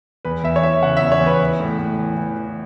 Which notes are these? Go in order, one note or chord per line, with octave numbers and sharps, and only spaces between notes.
E2 B4
E2 E5
C#5
E3 E5
C#3 F#5
E5
E2
C#5
E2
B4
E3
A2
A2
E3
E3
E3